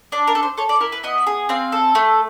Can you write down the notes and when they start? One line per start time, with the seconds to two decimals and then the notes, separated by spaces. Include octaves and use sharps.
0.12 D4
0.27 A#4
0.35 A4
0.43 C5
0.58 A4 C#5
0.69 D5
0.80 E4 A#4
0.92 B4
1.04 B3 D#5
1.27 G#4
1.49 C4 F5
1.72 A4
1.95 A3